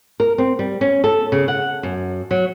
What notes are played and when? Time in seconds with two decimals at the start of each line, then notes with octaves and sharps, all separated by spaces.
0.20 A#4
0.38 C4
0.59 G3
0.81 C#4
1.04 A4
1.32 C#3
1.48 F#5
1.83 F#2
2.31 F#3